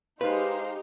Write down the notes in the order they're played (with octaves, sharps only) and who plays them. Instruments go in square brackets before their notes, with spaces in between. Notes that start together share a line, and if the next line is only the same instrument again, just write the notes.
[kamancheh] G#3 C5 [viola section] D#4 G4 [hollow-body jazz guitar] B4 [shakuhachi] F5